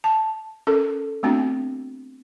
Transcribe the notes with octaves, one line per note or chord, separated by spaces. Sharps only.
A5
C#4 A4 A#4
A3 B3 C4 D4 F#4